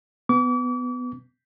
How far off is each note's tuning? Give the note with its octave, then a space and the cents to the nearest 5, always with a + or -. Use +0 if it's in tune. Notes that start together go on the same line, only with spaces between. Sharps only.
B3 +15 D6 -40